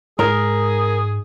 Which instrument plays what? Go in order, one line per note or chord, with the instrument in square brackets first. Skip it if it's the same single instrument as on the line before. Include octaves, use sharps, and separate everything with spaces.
[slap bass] G#2 G#3 [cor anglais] G#4 [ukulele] A#4